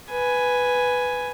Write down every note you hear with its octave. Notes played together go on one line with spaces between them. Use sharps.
B4 G#5